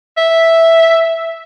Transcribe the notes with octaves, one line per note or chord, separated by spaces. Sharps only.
E5